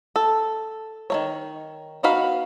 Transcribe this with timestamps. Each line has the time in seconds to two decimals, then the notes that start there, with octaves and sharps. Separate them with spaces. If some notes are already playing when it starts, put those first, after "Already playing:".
0.16 A4
1.10 D#3 A#3 C#5
2.03 B3 D#4 F#4 F5 B5